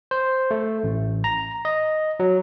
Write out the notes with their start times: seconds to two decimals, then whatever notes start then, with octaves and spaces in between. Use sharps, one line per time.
0.11 C5
0.51 A3
0.84 A1
1.24 A#5
1.65 D#5
2.20 F#3